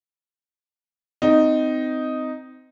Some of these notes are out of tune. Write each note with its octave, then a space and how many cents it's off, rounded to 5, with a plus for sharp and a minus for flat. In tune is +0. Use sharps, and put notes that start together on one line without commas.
C4 -25 D#4 +0